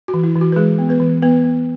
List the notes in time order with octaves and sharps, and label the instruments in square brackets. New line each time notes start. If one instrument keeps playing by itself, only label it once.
[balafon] F#4
E3
E4
E3
F#4
B4
E3 G#3 G#4
B3
B3 B4
E3
B3 B4
B3